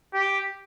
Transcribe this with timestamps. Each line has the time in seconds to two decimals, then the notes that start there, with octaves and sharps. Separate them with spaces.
0.13 G4